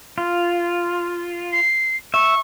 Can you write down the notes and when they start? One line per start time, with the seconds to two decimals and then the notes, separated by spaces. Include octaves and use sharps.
0.18 F4
1.53 C7
2.14 E5 C#6